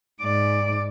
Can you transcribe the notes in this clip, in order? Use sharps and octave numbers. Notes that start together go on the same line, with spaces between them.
G#2 D5